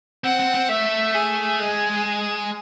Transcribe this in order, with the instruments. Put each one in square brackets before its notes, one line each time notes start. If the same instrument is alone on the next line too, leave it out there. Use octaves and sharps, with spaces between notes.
[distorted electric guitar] C4 [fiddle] F#5
[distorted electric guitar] C4
C4
[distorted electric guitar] A3 [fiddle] E5
[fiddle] G#4
[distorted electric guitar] G#3